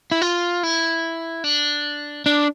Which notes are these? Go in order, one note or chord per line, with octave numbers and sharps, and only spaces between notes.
E4
F4
E4
D4
D4